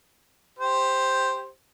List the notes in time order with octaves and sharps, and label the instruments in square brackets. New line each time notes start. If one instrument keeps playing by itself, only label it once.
[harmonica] G4 C5